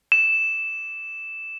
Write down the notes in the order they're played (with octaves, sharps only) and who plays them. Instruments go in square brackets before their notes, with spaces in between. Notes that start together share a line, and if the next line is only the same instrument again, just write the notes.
[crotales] E7